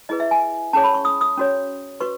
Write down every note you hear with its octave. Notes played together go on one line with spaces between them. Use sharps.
E4 G#4 B4 D#5
E5
G#5
C#4 G#4 C#5 A5
B5
C#6
D#6
D#6
C#4 F#4 C#5
F#4 B4 C#6